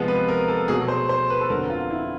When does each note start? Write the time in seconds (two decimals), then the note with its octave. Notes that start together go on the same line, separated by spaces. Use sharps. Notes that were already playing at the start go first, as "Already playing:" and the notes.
Already playing: C3 F3 G#3 B3
0.08 B4
0.28 A#4
0.48 A4
0.68 B2 F#3 A3 G#4
0.88 C5
1.09 C5
1.30 B4
1.41 A4
1.50 F2 D3 F#3 B3 A#4
1.70 F4
1.90 E4